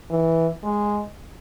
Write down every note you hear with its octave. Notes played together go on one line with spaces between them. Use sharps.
E3
G#3